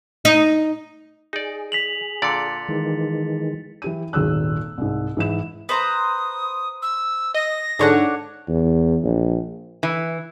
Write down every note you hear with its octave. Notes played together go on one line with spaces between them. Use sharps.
D#4
D#4 G#4 D5
B6 F7 F#7
A#2 D3 D5 A6 C#7
D#3 E3 G#3
E3 G4 D#7
D#1 G#1 G#4 E6 F#6
C2 G#2
G#2 E3 E7
B4 C5 A#5 D#6
E6
D#5 A#6
G#2 D3 D4 C#5 F#5
E2
A#1
E3